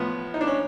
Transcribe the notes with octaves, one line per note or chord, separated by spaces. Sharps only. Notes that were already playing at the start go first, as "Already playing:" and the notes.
Already playing: A2 F3 B3
D#4
D4
C#4